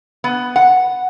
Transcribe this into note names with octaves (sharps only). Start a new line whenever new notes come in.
B3
F#5